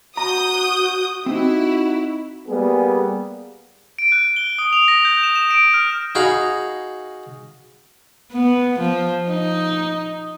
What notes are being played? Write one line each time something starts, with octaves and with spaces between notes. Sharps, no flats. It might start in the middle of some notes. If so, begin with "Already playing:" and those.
F#4 A#5 D#6 G6
C4 D#4 E4 F#4 G4
G3 A#3 B3 G#4
D7
F#6
G7
D#6
F7
A#6
G6
E7
E7
D7
F6
D#4 F#4 G#4 F5 A#5 B5
B3
F3
D#4